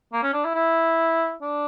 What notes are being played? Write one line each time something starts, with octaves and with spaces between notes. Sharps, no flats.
A#3
C#4
D4
E4
E4
D4